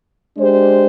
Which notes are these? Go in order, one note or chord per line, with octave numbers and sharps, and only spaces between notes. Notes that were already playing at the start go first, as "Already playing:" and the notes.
G#3 D4 G4 C5